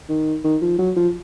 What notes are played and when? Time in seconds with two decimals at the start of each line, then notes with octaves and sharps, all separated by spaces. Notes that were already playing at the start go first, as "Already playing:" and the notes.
0.09 D#3
0.44 D#3
0.62 F3
0.79 F#3
0.96 F3